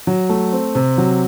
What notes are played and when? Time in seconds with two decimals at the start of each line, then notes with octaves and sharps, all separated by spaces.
0.07 F#3
0.29 A3
0.52 C4
0.75 C3
0.98 F#3